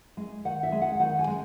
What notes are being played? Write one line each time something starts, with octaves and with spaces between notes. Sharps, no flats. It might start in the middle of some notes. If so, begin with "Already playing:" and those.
G#3
D#3 F#5
E5
G#3
F#5
D#3 F#5
G#5
G#3